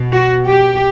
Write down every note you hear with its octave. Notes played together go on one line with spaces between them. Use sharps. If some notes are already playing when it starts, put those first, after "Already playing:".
Already playing: B2
F#4
G4